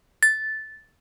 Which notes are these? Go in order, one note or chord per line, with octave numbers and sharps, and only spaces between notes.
A6